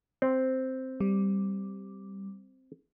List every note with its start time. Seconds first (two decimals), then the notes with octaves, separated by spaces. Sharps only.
0.22 C4
1.00 G3